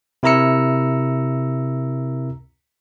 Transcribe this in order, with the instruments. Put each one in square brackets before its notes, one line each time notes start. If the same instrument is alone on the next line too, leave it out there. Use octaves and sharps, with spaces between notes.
[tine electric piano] C3 E4 A#4 A#5 E6 C#7